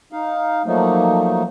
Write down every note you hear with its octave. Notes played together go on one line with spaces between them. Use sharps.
D#4 F5
F3 F#3 A3 A#3 D#4